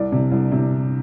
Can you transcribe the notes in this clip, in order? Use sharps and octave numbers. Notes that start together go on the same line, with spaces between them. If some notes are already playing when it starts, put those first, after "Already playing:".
Already playing: C2 D5
C3
C2
C3